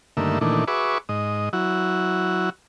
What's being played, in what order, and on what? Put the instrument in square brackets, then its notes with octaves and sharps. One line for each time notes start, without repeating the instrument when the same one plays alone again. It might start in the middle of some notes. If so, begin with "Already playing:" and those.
[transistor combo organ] G2 D3 D#3 A3 A#3 E5
A#2 D#3 E3 A3 D4
F#4 G#4 B4 E5 C#6 D6
G#2 D#5
F#3 E4 F#4